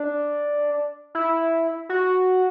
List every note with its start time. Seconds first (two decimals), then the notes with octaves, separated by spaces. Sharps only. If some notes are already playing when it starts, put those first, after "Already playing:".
Already playing: D4
1.15 E4
1.89 F#4